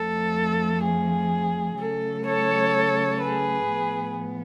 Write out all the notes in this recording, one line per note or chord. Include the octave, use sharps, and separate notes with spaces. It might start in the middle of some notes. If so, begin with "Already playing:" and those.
Already playing: F2 F3 A3 A4
G#4
C#3 F#3 A3 A4
A4 C#5
G#4 B4
A2 F3 B3